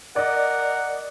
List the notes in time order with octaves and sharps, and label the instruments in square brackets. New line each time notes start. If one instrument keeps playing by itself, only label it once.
[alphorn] A#4 [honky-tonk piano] D5 D#5 [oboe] F#5